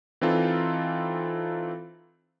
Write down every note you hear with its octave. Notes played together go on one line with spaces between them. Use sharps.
E3 C4 D#4 F4 A4